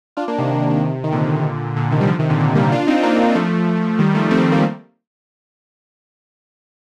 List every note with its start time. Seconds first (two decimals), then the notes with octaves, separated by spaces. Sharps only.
0.17 D4 F4
0.28 A#3 D4
0.38 C3 D#3
1.04 D#3
1.12 A#2 D3
1.76 A#2 D3
1.91 C3 D#3
2.01 G3
2.07 D3 F3
2.19 C3 D#3
2.29 A#2 D3
2.40 A#2 D3
2.55 G3 A#3
2.72 D4 F4
2.87 C4 D#4
3.03 A#3 D4
3.35 F3 A3
3.99 D#3 G3
4.15 F3 A3
4.31 A3 C4
4.41 A3 C4
4.52 G3 A#3